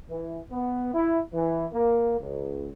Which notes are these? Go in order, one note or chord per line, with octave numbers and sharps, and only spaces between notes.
E3
B3
E4
E3
A#3
C#2